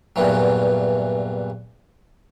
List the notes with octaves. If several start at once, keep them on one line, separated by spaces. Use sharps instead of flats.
E2 G2 A#2 E3 F#3